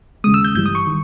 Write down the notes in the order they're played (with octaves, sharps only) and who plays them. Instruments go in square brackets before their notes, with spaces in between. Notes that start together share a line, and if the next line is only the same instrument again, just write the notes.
[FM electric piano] D#2 C#3 G#3 D#6
E6
G6
G1 G2 E3 G3 G6
D#6
C#6
D#3